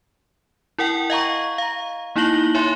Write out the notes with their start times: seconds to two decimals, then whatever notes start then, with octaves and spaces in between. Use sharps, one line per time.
0.78 E4 A#4 F#5 G5
1.10 D#5 F5 A#5 C#6
1.58 F5 A#5
2.16 A#3 D#4 E4 A#6 F#7 G7
2.55 C#5 E5 G#5 C6